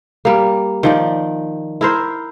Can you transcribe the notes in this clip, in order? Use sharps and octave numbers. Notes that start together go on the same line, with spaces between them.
G3 A#3
D#3 F3 D5
E4 A#4 C5